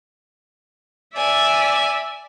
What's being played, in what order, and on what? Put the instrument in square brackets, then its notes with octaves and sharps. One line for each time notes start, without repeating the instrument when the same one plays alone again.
[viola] D5 E5 [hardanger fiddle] G#5